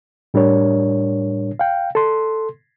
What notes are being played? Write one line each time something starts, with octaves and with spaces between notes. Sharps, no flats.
A2 G3 D4 A#4 C#5
F5 G5
A4 C6